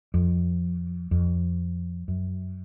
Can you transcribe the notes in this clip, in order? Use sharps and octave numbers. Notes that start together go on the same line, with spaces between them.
F2
F2
F#2